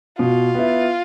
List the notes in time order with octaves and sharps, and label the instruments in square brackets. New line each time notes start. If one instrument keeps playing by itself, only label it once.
[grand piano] B2 [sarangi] F4
[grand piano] B3 E4